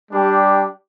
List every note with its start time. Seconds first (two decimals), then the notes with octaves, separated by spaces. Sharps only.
0.11 G3 D4 G4